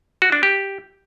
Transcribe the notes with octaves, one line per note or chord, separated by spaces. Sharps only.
F#4
D4
G4